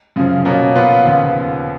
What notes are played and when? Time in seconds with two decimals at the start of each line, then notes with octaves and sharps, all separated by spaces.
0.16 F#2 C#3 F3
0.45 B2 A#3 C#4
0.75 A#2 F3 B3 F4 B4
1.05 D#2 C#3 F3 B3